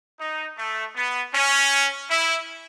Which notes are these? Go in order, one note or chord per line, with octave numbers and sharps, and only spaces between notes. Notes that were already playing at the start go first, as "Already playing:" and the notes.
D#4
A3
B3
C#4
E4